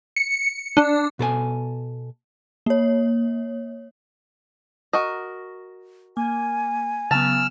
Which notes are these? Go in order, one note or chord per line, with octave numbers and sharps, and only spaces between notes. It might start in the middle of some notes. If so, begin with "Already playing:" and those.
C#7
D4
B2 A4 A#4 G#5
A#3 C#5
F#4 A#4 D#5
A#3 G#5
C#3 F#3 B3 A5 E6 F6